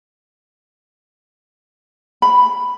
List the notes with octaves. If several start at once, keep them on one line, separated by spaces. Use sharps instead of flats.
B5